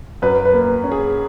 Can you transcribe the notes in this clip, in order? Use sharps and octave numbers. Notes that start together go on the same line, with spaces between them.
F#2 B4
B4
A#3
C#4
G#4